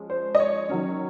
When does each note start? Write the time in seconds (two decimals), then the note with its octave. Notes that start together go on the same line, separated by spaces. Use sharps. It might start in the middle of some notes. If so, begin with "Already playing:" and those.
Already playing: F3 G#3 C#4
0.10 C5
0.35 D#5
0.40 C#5
0.69 D#3 F#3 C#4